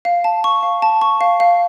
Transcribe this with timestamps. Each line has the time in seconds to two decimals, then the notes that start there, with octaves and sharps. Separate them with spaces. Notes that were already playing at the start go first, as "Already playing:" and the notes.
0.05 F5
0.24 A5
0.44 C#6
0.63 F5
0.82 A5
1.01 C#6
1.21 F5
1.40 F5